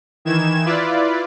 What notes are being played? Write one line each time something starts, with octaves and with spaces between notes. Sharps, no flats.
D#3 E3 G#6 E7
E4 F4 B4 D5